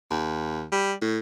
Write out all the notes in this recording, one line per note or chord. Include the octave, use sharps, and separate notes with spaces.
D#2
G3
A2